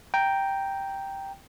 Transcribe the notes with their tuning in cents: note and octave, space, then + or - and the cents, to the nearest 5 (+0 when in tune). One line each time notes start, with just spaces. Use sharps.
G5 +0 A#5 +0